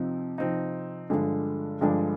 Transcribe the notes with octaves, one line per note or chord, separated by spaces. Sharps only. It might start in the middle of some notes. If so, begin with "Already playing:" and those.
Already playing: C3 F3 C4 D#4
C3 F3 C4 D#4
G2 D3 F3 G#3 D4
G2 D3 F3 G#3 D4